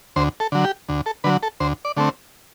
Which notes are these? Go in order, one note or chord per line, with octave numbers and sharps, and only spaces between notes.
D2 C5
A4
D3 F#3
G4
D2
A4
D3 F#3 B4
A4
D2 C5
D5
D3 A3 C4